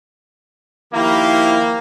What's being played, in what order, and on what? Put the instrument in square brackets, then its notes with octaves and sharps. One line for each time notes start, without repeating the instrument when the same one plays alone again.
[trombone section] D#3 F3 E4 [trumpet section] A#3 [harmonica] G4 F5